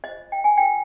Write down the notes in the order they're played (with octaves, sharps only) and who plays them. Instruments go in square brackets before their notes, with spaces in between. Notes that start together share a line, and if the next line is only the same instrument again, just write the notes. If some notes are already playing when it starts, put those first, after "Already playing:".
[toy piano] F4 C5 D#5
G5
G#5
F4 A#4 G5